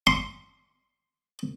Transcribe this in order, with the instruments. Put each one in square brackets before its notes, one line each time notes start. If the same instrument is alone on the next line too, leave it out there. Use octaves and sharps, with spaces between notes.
[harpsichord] C6